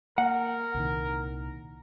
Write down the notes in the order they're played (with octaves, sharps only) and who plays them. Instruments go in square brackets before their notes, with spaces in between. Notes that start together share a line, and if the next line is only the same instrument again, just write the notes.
[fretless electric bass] A#3 [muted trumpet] A#4 [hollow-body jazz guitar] F#5
[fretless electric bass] C2 A#2 D#3